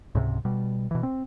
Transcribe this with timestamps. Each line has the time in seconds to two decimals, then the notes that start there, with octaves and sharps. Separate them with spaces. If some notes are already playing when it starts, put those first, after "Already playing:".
0.15 C#2 G#2 C3
0.45 B2 G3
0.91 B2 E3
1.03 C4